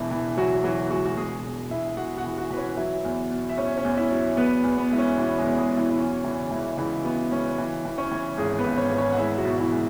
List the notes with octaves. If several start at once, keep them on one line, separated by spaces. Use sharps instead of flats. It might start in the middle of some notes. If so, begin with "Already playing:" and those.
Already playing: E1 E2 E3 E4
E3
E3 F#3 F#4
E3 F#3 F#4
F#3 G#3 F#4
F#4
E1 G#3 G#4
E1
E1 E4 E5
E5
E1 F#4 F#5
F#4 F#5
E3
F#4 F#5
E3 B4
C#4 C#5
F#3 E4 E5
E2
B2
E5
E2 C#4 C#5
C#4 C#5
E2
E4 E5
F#3
E2 B3 B4
E2
B3
G#3 E4
C#4
B2 E3 E4
G#3 G#4
E2
G#3 G#4
B2
E3 E4
E4
F#3 C#4
C#3 E3 E4
C#2 E3 E4
C#2 E3 E4
F#3 B3
C#2 C#4
E3
E3
C#4 C#5
E3
G#1 G#3 G#4
B3 B4
G#1
C#4 C#5
G#1
C#4 C#5
F#5
G#3 E4 E5
F#3 F#4
B2
E3 E4
G#3